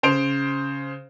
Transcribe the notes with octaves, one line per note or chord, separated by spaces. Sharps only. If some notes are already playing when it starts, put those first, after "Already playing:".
C#3 C5 D7 F7